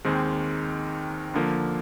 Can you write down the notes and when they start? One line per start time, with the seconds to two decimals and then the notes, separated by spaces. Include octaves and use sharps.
0.05 D#2 D#3 G#3 C4
1.34 D3 F3 A#3